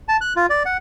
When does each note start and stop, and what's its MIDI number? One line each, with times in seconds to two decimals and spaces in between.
0.09 0.17 81
0.21 0.33 90
0.36 0.46 65
0.50 0.63 74
0.65 0.77 78